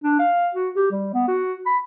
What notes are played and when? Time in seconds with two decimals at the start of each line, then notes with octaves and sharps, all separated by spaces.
0.04 D4
0.20 F5
0.55 F#4
0.76 G4
0.92 G3
1.14 B3
1.28 F#4
1.66 B5